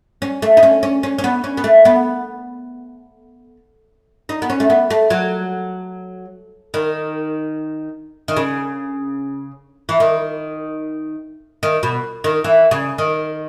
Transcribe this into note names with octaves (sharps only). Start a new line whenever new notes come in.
C#4
A3
D#4
C#4
C#4
C#4
C#4
B3
C#4
B3
A3
B3
D#4
B3
C#4
A3
B3
A3
F#3
D#3
D#3
C#3
E3
D#3
D#3
B2
D#3
E3
C#3
D#3